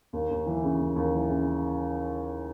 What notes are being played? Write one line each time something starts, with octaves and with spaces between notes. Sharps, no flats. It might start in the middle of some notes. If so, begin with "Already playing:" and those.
D#2
D#2
E3
C#3
D#2
D#2
E3
C#3